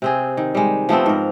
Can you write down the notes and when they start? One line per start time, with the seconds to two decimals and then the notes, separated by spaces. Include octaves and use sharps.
0.02 C3 C4 G#4
0.37 D#3
0.55 G3 G#3
0.89 F3 A3 B3 C4
1.06 G#2 A#4